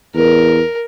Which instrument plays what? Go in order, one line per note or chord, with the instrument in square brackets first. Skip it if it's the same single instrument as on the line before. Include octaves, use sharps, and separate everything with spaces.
[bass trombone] E2 [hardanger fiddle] A#4